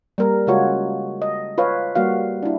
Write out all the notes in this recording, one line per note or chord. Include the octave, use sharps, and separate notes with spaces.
G3 A#3 A#4
C#3 G#3 F4 F#4 C#5
D#5
F4 B4 C#5 F5
G3 A#3 F#4 F5
D4 E4